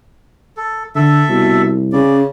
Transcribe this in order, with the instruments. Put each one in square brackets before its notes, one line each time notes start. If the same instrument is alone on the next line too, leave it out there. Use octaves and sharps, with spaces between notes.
[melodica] A4
[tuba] D3 [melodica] A4 E5
[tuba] C2 [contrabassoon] B2
[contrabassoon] C#3 [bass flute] C#4 [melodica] D5